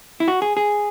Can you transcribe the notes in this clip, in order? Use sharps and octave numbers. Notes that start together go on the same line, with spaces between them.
E4
F#4
G#4
G#4